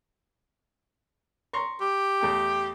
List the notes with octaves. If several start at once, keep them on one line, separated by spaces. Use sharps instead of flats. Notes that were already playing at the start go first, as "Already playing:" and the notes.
A#5 C6 C#6
G4
E2 A3 G5